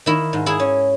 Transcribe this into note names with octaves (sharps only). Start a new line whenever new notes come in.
D#3 E4
G#2
E4 G#4
C#4